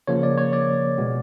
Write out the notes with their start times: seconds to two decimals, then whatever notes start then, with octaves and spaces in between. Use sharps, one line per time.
0.07 C#3 F3 A#3 C#5
0.23 D5
0.38 C#5
0.53 D5
0.98 B2 G#3 B3